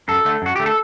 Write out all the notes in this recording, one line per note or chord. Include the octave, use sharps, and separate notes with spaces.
F#2 A4
D3 A3
F#2 F#4
D3 A3 G4
A4